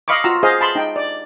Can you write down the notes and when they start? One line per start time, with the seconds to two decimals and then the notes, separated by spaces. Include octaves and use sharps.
0.08 D#5 F5 B5 C#6 D6
0.24 F4 F#4 A#5 E6
0.43 G#4 C5 D#5 F5
0.61 A5 B5 C6
0.76 D#4 G5
0.96 D5